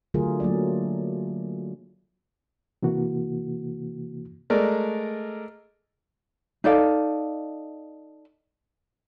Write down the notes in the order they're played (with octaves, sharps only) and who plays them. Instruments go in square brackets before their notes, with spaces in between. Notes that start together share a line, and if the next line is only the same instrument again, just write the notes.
[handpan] D3 F#3 A3 F4 G#4 A#4
F#3 A3 A#3 D5
[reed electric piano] C3 E3 A#3 F#4
[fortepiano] G#3 A3 A#4 D5
[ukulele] D#4 A4 D5 F5